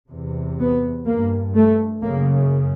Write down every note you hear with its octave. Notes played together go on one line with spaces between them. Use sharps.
E2 C3
B3
G2 A#3
A3
F#2 C#3 A#3